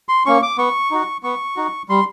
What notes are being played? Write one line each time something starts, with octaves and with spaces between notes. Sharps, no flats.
C6
A#3 C#4 C#6
D6
B3 C#6
D#4 F#4
B3 C#6
D#4 F#4
G3 C6